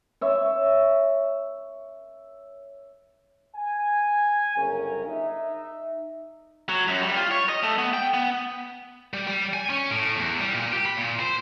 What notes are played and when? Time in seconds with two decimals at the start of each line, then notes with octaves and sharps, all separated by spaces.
0.21 C#5 E5
3.55 G#5
4.56 G1 F#2 C#3 C#4 G#4 A#4
5.05 D#4 E5
6.69 F#3
6.88 F#2
7.03 G3
7.16 F4
7.31 C#5
7.49 D#5
7.63 A3
7.78 B3
7.93 G5
8.14 B3
9.14 G3
9.28 G3
9.53 G#5
9.70 C#4
9.91 A2
10.16 E2
10.41 G3
10.53 A#2
10.72 G4
10.86 B5
10.97 A#2
11.20 C5